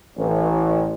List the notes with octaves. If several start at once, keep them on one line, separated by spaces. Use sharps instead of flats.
A1